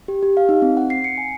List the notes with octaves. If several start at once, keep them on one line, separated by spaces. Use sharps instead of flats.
G4
G4
F5
D#4
C4
F#5
C7
C#7
G#5